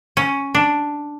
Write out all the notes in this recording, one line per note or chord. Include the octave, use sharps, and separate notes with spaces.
C#4
D4